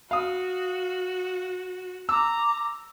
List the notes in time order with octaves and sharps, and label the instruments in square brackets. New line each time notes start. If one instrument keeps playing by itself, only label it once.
[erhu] F#4 [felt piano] F5 D#6
[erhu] A#5 [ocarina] D6 [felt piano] E6